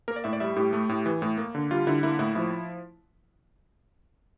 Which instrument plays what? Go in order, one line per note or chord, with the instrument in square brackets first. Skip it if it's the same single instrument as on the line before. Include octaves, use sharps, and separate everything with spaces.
[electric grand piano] A#3 A#4
D5
A2 E5
D5
G3 E5
A2 G4
A3
A2
E3
A2
A#3
D3
G3 F4
D3 E4
A#3 E4
A2 E4
F3 E4